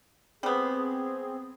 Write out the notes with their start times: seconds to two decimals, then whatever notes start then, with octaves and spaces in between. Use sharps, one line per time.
0.43 G3 B3 C4 G#4